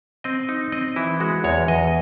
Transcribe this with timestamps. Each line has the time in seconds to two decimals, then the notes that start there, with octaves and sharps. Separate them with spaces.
0.24 C4 D#5
0.49 D#4
0.72 C4 D#5
0.96 E3 E4
1.20 G#3 F#4
1.44 E2 C#5
1.68 E2 D#5